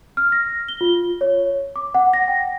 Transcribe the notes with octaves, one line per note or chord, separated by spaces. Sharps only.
F6
A#6
G7
F4
C#5
D6
F#5
A#6
G5